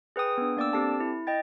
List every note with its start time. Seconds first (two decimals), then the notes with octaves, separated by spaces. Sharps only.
0.16 G#4 B4 G5 D#6
0.38 B3 D4
0.57 A#3 D4 D5 G5 D6 E6
0.73 C4 G4 A4 A5
1.00 E4
1.27 D#5 G5 A6